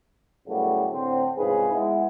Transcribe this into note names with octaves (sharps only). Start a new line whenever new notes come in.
F#2 A2 C#3 G3 A3 B3
A2 D3 C4
C2 G#2 C#3 F3 G#4 B4
G#3 B3 E4